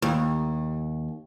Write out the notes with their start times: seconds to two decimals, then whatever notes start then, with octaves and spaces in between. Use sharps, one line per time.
0.02 D#2